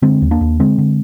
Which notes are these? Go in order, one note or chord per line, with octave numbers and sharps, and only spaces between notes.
D3 G#3 C4
D#2
A#3 D4
D#2
D3 G#3 C4
D3